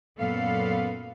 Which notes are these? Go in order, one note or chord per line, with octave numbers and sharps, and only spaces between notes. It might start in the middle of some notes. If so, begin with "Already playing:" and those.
F#2 A#2 B3 A4 F5